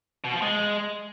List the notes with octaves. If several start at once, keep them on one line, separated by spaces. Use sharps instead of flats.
B2
F3
G#3